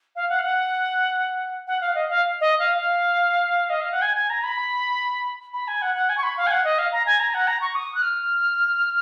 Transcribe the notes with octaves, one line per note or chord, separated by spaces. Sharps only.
F5
F#5
F5
F#5
F#5
F5
D#5
F5
D#5
F5
F5
D#5
F5
F#5
G#5
G#5
A#5
B5
B5
G#5
F#5
F#5
G#5
C#6
B5
F5
G#5
F#5
D#5
F5
A#5
G#5
A#5
F#5
A#5
C#6
D#6
F#6
F6